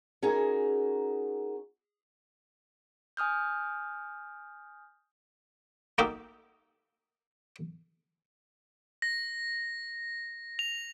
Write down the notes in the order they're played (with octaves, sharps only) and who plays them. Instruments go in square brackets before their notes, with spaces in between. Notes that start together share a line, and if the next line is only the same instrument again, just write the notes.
[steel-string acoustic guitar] C#4 D#4 F#4 G#4 A#4
[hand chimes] G#5 D#6 F6 G6
[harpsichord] A#3 D#4 F#4 G4 A4
[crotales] A#6
F7